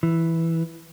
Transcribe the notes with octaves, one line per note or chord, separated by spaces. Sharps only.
E3